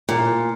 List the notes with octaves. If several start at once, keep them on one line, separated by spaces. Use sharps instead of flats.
A#2